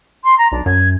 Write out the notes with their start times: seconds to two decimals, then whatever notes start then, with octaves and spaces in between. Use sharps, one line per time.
0.24 C6
0.38 A#5
0.52 B1 D4
0.66 F#2 G#6